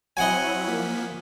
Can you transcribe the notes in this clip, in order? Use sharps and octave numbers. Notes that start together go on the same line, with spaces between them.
F#3 C4 E4 D#5 F#5 G#5
F3 A#3 B6